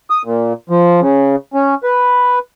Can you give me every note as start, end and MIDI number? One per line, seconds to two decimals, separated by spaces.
0.10 0.22 87
0.25 0.53 46
0.70 1.00 53
1.00 1.36 49
1.54 1.75 61
1.83 2.39 71